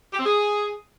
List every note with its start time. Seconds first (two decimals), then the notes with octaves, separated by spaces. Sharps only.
0.13 G4
0.19 C4
0.25 G#4